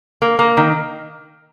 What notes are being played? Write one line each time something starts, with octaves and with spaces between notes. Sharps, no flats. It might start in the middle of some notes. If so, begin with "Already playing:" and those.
A#3
A#3
D#3